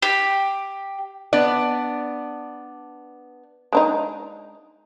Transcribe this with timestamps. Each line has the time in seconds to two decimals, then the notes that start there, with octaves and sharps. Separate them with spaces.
0.02 G4
1.33 B3 D4 D5
3.73 G#3 D4 D#4